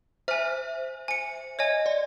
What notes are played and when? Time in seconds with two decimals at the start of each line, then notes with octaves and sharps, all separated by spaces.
0.28 C5 E5 G#5 F6
1.08 G#5 C#7
1.59 C#5 D#5 G#5
1.86 D5